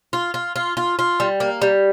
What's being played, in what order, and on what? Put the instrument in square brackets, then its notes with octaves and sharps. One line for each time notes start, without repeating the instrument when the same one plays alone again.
[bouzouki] F4
F4
F4
F4
F4
G3
A#3
G3